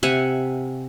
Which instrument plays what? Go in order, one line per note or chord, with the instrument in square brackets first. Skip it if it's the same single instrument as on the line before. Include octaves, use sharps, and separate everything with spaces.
[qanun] C3 E5 F#5 G#5